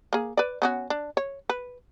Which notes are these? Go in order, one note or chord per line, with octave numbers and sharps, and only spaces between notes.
A#3 G#4
B4 D5
B3 C#4 F#4
D4
C#5
B4